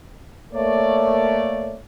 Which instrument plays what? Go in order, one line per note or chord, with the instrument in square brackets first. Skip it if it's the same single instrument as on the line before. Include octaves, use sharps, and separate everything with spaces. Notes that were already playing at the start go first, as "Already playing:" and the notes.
[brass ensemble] A3 A#3 C#5 D5